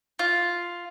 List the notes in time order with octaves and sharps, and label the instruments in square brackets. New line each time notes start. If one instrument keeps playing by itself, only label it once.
[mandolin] F4